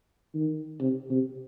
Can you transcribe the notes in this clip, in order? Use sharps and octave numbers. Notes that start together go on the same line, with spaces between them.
D#3
C3
C3